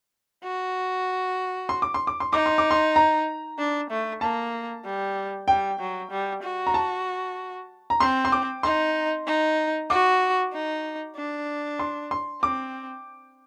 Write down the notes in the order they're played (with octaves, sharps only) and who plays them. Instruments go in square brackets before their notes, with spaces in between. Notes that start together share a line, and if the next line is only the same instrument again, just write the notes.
[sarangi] F#4
[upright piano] C6
D6
C6
D6
C6
[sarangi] D#4 [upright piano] D6
[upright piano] C6
D6
C6
A#5
[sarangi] D4
A3
[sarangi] A#3 [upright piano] A5
[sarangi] G3
[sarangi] G3 [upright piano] G5
[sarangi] F#3
G3
F#4
[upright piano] A#5
A5
A#5
[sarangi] C4 [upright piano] C6
[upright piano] C6
D6
[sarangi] D#4 [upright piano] C6
[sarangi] D#4
[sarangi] F#4 [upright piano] D6
[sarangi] D#4
D4
[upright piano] C6
C6
[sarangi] C4 [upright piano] D6